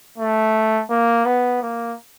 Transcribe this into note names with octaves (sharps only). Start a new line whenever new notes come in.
A3
A#3
B3
A#3